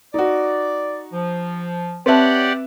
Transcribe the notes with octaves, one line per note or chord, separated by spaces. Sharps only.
D#4 F#4 D5
F3
C4 G4 B4 C#5 D5 E5 F#5 A5